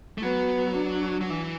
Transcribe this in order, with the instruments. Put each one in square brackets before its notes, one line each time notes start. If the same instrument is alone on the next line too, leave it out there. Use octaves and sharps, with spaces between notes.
[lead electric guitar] A3
[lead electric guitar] F#3 [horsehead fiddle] B3
[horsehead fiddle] D4
[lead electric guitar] F#3
E3